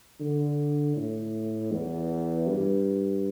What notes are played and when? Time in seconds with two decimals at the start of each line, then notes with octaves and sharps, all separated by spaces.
0.20 D3
0.96 A2
1.72 E2
2.47 G2